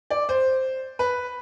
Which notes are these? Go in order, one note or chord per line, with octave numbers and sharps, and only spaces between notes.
D5
C5
B4